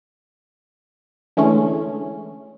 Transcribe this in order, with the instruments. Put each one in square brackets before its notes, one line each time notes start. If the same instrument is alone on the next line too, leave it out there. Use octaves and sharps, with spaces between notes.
[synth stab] D3 E3 G#3 A3 C#4